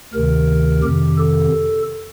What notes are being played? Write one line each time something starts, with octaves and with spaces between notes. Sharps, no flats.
D2 C3 D#3 A#4
F2 C3 D#3 G4
A4